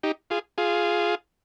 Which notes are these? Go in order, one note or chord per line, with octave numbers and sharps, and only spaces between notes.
D#4 G4
F4 G#4
F4 G#4